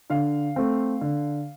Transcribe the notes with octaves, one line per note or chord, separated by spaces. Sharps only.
D3 F5
A3 C4
D3